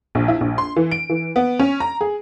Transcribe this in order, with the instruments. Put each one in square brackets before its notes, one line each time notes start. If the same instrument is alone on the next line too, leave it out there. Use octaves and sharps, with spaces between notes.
[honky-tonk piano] A#1
E4
A#1
C6
E3
D7
E3
B3
C#4
A#5
G#4